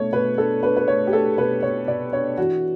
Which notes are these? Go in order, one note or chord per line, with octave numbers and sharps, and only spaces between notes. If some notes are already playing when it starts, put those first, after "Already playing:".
Already playing: B2 A3 D4 C#5
B2 B4
D4 A4
D4 B4
B4
A3 C#5
G4
D4 A4
B2 B4
B2 C#5
B2 D5
D4 C#5
E3 F#4